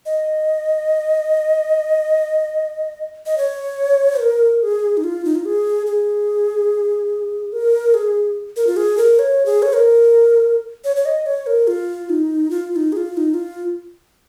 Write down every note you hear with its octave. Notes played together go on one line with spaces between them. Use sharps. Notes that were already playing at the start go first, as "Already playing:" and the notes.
D#5
D#5
C#5
A#4
G#4
D#4
F4
D#4
F4
G#4
G#4
A#4
G#4
A#4
F4
G#4
A#4
C#5
G#4
C#5
A#4
C#5
C#5
D#5
C#5
A#4
F4
D#4
F4
F4
D#4
G#4
F4
F4
D#4
F4